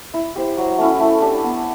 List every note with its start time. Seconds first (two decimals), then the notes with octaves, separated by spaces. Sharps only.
0.14 E4
0.36 G4 C5
0.57 F#3
0.78 A3 C#4 E4
1.00 A3
1.22 D4 G4
1.44 B3